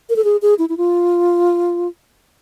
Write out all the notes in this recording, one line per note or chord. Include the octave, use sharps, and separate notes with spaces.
A#4
A4
G#4
G#4
E4
E4
F4